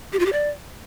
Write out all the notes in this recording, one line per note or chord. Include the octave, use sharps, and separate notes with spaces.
G4
F4
G4
D5